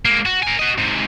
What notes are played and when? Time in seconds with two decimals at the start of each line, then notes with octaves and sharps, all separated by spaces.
0.05 G#3 A#3
0.26 F#4
0.43 A#4 G#5
0.59 F#4 D#5
0.78 G#2 C3